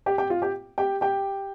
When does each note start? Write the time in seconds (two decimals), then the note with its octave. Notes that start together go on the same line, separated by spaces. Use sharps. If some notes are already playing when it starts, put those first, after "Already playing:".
0.06 G4 G5
0.18 G4 G5
0.30 F4 F5
0.42 G4 G5
0.78 G4 G5
1.01 G4 G5